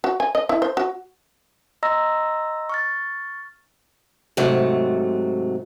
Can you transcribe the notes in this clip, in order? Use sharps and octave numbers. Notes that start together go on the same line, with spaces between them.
F#4
G#5
D#5
E4
C5
F#4
D#5 A#5 C6 E6 A#6
C#6 F6 A6
G#2 C3 F#3 A3